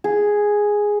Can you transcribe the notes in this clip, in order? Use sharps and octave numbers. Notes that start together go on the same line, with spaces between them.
G#4